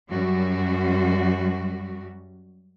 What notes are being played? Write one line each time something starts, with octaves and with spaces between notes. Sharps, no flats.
F#2 G3 F#4